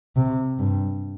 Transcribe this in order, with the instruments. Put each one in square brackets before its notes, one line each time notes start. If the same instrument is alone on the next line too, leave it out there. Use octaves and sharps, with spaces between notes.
[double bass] C3
G2